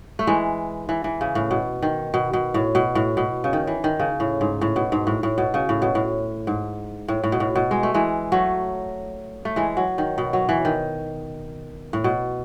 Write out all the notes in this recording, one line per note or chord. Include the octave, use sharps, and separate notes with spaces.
A3
E3 G#3
E3
E3
C#3
A2
B2
D#3
B2
B2
A2
B2
A2
B2
C#3
D#3
E3
D#3
C#3
A2
G#2
A2
B2
G#2
A2
A2
B2
C#3
A2
B2
A2
G#2
A2
A2
B2
A2
B2
G#3
A3
E3 G#3
F#3 A3
A3
E3 G#3
F#3
D#3
B2
F#3
E3
D#3
A2
B2